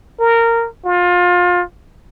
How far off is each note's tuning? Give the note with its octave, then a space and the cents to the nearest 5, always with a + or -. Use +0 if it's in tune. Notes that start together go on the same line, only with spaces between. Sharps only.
A#4 -15
F4 +25